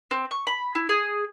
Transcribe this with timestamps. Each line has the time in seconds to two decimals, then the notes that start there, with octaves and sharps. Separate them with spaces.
0.11 C4
0.31 C#6
0.47 B5
0.75 E4
0.89 G#4